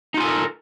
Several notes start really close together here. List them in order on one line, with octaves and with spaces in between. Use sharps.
D#4 F4 G#5 A4 A#4